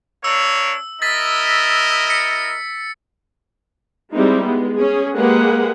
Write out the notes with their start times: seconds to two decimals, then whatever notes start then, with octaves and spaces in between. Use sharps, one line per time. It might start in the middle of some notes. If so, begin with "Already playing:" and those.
0.24 A#3 D4 C#5 E6
1.02 E4 A#4 D#5 A6 B6
2.10 C#7
4.12 G3 G#3 C4 D#4 E4
4.43 G#3 B3
4.76 C#4 G#4
5.15 G#3 A#3 G4 G#4 B4 F#5